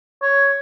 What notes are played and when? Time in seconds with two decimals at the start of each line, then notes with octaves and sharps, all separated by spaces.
0.22 C#5